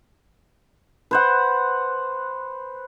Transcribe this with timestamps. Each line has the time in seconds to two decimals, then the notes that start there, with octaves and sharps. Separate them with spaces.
1.11 B4 C5 F#5